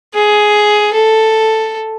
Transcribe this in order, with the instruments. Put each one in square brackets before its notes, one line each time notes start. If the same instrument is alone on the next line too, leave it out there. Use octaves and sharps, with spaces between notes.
[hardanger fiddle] G#4
A4